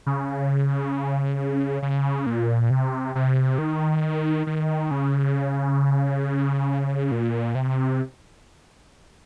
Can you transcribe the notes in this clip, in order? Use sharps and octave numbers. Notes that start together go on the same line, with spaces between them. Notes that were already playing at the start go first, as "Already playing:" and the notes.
C#3
C#3
A#2
C3
C3
D#3
D#3
C#3
A#2
C3